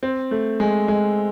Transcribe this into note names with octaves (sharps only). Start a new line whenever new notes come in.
C4
A3
G#3
G#3